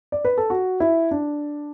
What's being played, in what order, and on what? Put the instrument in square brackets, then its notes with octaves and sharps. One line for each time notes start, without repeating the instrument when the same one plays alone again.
[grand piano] D5
B4
A4
F#4
E4
D4